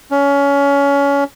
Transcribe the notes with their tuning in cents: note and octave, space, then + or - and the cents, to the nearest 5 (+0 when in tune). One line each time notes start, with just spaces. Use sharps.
C#4 +25